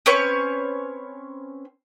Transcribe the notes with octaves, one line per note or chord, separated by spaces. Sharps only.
C4 C#4 B4 C#5